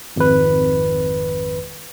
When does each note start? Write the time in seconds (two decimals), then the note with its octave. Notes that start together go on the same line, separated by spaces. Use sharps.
0.16 G#1 F2 B4